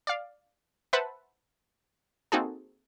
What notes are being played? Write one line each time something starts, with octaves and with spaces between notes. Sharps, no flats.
D5 F5
B4 C5 E5 F#5 A5 B5
A#3 C4 D#4 F#4 G#4 A4